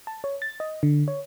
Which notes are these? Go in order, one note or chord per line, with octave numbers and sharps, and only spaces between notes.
A5
C#5
A6
D#5
D3
C#5